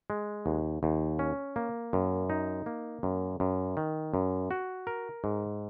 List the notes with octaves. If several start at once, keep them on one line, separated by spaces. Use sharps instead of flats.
G#3
D#2
D#2
C#4
A#3
F#2
D#4
A#3
F#2
F#2
D#3
F#2
F#4
A#4
G#2